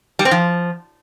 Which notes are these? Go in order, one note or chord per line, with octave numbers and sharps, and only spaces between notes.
G3
C4
F3